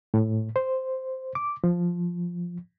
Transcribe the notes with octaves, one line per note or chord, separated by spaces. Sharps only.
A2
C5
D6
F3